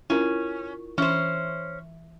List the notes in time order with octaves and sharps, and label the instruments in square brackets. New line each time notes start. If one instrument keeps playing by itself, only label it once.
[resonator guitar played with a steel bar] C#4 [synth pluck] E4 F4 A#4
[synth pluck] E3 E5 [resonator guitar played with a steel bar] C#4 C5